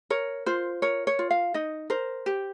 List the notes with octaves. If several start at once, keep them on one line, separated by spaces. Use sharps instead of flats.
A#4 C#5
F4 C5
A#4 C#5
C#5
F4
F5
D#4 D#5
A#4 C5
G4